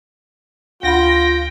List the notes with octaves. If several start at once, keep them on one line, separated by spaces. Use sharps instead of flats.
D2 F4 F#5 G5 B5 A#6